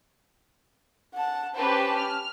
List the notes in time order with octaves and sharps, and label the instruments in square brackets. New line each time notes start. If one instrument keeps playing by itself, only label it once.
[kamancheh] F#5 A5
[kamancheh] C#4 A5 [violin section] G4 B4 C5
[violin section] F6